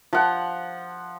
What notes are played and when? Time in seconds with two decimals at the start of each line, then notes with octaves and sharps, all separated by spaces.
0.13 F3 F#5